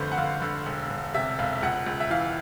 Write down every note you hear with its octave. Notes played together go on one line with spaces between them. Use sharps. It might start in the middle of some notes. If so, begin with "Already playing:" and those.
Already playing: F1 D3 B4 C5
F#5
D3 F5
D3
E1
E1
C3 E5
E1 F5
C#2 F#5
C#2
E5
E3 F5